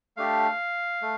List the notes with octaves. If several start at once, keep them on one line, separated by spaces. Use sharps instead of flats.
A3 D4 G4 F5
A3